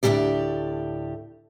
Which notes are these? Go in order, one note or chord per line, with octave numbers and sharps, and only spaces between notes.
D2 A2 C#3 E3 G4 D5